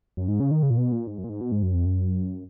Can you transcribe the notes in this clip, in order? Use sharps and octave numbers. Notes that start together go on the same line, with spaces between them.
F#2
G#2
C#3
D#3
C#3
A#2
B2
A#2
G#2
F#2
A#2
G#2
B2
G#2
F#2
F2
F#2